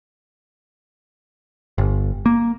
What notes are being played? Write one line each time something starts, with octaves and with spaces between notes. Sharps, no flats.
G1
A#3